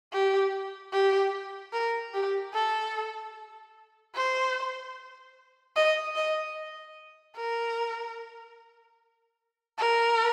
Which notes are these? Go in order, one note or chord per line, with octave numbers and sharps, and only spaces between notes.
G4
G4
A#4
G4
A4
C5
D#5
D#5
A#4
A#4